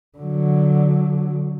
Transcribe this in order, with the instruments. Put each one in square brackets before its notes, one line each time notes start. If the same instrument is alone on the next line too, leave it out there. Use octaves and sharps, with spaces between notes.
[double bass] D3 F#3